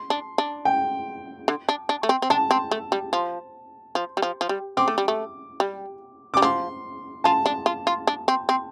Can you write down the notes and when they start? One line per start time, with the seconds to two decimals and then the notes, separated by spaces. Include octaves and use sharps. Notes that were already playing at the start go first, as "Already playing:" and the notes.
Already playing: C6
0.10 D4
0.38 D4
0.65 G5
1.48 D3
1.69 D4
1.89 D4
2.03 A3
2.09 C4
2.22 C4
2.30 D4 A5
2.51 C4
2.71 A3
2.92 G3
3.13 F3
3.95 F3
4.17 G3
4.22 F3
4.41 F3
4.49 G3
4.77 C4 D6
4.88 A3
4.98 G3
5.08 A3
5.60 G3
6.34 G3 D6
6.42 F3 C6
7.24 F4 A5
7.46 D4
7.66 F4
7.87 F4
8.07 D4
8.28 C4
8.49 C4